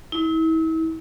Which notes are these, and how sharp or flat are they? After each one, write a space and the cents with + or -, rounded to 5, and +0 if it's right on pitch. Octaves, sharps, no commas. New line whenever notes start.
E4 -40